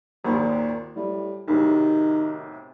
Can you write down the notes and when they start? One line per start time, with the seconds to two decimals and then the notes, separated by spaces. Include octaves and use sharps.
0.24 G#1 D#2 A#2 D#3
0.96 A2 G3
1.48 B1 A2 C3 D#3